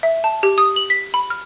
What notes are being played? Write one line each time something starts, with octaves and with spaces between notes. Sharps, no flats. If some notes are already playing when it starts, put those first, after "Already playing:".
E5
A5
G4
D#6
F#7
B6
B5
F6